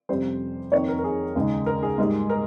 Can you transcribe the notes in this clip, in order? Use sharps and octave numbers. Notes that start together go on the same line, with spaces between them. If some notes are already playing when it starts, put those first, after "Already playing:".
F2 C3 G3 C#4 C5
F2 D#3 A#3 D#4 C#5
A#4
A#4
G#4
D#2 C#3 G#3 D#4
A#4
G#4
G#2 G3 A#3
A#4